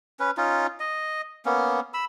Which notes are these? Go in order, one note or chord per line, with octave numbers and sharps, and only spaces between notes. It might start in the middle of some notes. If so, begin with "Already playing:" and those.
C#4 B4
C#4 D#4 F4
D#5
A#3 B3 C#4
B5 E6